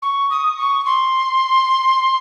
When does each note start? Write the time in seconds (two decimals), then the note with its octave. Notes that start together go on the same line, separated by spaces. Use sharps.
0.02 C#6
0.30 D#6
0.57 C#6
0.85 C6